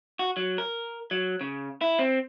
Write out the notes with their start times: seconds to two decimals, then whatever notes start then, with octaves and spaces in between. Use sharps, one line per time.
0.19 F#4
0.37 F#3
0.58 A#4
1.11 F#3
1.41 C#3
1.81 E4
1.99 C4